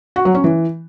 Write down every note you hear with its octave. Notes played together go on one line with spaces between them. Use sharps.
F#4
F#3
C#4
E3